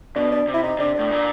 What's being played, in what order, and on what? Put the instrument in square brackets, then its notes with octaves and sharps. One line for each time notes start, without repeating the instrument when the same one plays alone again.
[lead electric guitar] B2 [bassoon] D4
[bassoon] D4
[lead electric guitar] C3
[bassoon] E4
D#4
[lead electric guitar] C3 [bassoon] D4
[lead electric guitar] A2 [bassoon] D4
[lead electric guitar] A#2